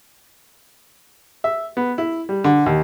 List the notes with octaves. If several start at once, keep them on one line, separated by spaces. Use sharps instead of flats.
E5
B3
E4
G3
D3
D#2